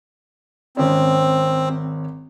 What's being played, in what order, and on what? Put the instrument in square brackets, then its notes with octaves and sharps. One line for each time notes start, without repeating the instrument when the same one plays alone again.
[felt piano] G#1 C#4 [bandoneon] C4